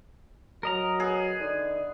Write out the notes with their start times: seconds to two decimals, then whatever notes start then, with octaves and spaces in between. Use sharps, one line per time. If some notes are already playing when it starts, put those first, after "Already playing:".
0.63 F#3 A#4 D#5 A#5
1.00 B3 G#4
1.41 D3 D#4